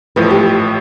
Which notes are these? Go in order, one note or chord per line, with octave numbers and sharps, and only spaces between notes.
A1 A2 F3 B4
G4